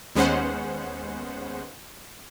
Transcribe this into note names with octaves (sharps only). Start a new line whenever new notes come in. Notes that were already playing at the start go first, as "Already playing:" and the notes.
D#2 G#3 B3 C#4 C5 F#5